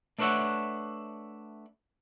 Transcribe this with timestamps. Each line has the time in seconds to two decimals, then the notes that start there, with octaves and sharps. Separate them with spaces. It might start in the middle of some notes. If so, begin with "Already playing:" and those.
0.18 A3 D4 B4 C#5 E5 F#5